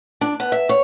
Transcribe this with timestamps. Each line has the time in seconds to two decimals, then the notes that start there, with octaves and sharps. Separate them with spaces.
0.21 D4
0.40 B3
0.52 E5
0.69 C#5